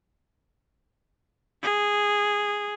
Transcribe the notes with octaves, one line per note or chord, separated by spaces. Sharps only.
G#4